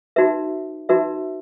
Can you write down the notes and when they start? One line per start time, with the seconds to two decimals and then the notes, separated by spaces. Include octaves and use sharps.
0.16 D#4 F#4 B4 E5
0.89 D#4 F#4 B4 E5